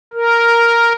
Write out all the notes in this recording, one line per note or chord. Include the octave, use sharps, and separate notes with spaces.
A#4